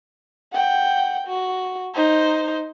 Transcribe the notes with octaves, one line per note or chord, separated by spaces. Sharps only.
F#5 G5
F#4
D#4 C5